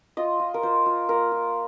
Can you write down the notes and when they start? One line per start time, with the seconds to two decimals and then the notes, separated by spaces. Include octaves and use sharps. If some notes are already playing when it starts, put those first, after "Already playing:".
0.17 F4 D#5
0.40 F4
0.54 A#4
0.63 F4 C5
0.86 F4
1.09 A#3 A#4
1.32 F4